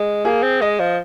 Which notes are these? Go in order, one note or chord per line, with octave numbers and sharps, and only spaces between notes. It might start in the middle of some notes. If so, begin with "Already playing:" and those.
Already playing: G#3
A#3 G#4
C4
G#3 D#5
F3